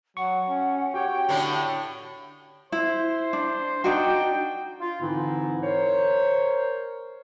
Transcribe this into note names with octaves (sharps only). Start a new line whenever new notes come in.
F#3 F#5 C#6
C#4
F#4 G4 C#5 G5
A2 D3 D4
E4 C5
D4
D4 D#4 F#4 G5
F4
G#2 D3 E3 C4 D#4 E4
A#4 C5 C#5